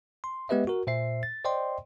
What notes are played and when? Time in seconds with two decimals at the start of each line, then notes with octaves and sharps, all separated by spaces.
0.24 C6
0.49 G#3 B3 G4 B4 D#5 E5
0.67 F#4 A#4
0.87 A#2 C5 E5 C7
1.23 A6
1.44 C5 D5 D#5 G5 C6